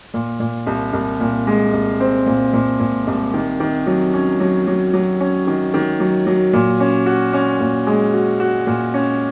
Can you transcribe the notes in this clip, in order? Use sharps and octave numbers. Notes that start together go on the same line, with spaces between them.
A#2
A#2
C2
C2
A#2
G#3
C2
C4
A#2
A#2
A#2
C2
D#3
D#3
F#3
C#4
F#3
F#3
F#3
C#4
D#3
D#3
F#3
F#3
A#2
C#4
F#4
C#4
A#2
G#3
F#4
F#4
A#2
C#4